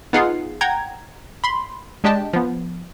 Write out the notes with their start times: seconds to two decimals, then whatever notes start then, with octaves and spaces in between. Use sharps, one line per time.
0.13 B3 D#4 F4 G#4 F#5 C7
0.61 F#5 G5 A#5 G#6
1.44 B5 C6
2.04 G#3 D4 G4 D#5 G5 A5
2.33 F3 B3